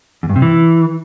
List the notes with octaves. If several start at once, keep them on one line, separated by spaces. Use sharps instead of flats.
E2
G2
C3
E3